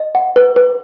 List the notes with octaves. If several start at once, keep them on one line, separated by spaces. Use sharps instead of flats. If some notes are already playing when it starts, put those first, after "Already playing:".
Already playing: D#5
F#5
B4
B4